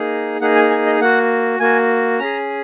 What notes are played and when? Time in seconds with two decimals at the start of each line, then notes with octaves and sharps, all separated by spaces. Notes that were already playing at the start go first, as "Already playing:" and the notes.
Already playing: A#3 D#4 G#4
0.41 A#3 D#4 G#4 F#5
0.55 G#5
0.70 G#5
0.86 D#5
1.00 A#3 F#4 F#5
1.60 A#3 F#4 G#5
2.19 C#4 G#4 A#5